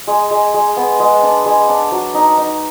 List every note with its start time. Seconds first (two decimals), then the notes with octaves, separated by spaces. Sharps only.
0.07 G#3
0.31 G#3
0.54 G#3
0.77 B3
1.00 G#3
1.23 D4
1.46 G#3
1.69 D4
1.92 F#3
2.14 D#4
2.38 D#4